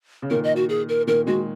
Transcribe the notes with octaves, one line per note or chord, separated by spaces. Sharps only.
C#3
A#2 D#3 A#4
D#5
F#4
G#4
A#4
A#2 D#3 A#4
D#3 G#3 F#4